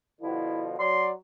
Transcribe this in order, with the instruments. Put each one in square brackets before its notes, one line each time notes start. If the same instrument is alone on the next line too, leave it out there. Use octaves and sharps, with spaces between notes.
[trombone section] B2 D3 F3 [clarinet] E4
[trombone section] F#3 [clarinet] D5 [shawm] C6